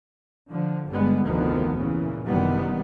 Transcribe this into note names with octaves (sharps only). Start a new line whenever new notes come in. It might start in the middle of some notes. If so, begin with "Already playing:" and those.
D3 F3
G1 D3 G3 G#3 B3
F1 D2 D3 D#3 F3 B3
A#2 C#3 E3
F#1 C3 D#3 E3 G3 B3